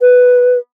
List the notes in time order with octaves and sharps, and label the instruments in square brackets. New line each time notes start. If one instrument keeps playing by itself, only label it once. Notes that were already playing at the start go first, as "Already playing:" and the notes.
[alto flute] B4